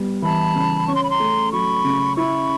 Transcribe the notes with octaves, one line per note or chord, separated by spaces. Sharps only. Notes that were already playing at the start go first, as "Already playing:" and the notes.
Already playing: G3 B3
E3 A5 B5
C#3
C#4 C#6
C6
B5
A#5 C6
A3
F#3 B5 C#6
C#3
E4 B5 C#6